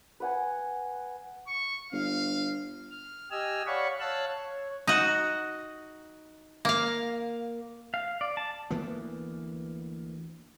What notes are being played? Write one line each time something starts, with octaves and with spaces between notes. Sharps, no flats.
B4 F#5 G#5
C#6
G1 F5
F6
G4 D#5 G#5 E6 F6
C#5 D5 F5 F#5 B5 C#6
C#5 F5 A5 E6 F#6
C#5
D#4 F#4
A#3 F5
F5
D5
A5
D2 E3 A#3 B3